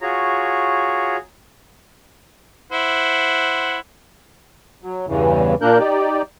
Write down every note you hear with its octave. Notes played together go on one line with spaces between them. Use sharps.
F4 F#4 G#4 C#5 A#5
E4 C5 F#5
F#3
E2 G2 C#3 E3
A#2 A#3 D4 A#4 F#6 G6
D#4 G4 D5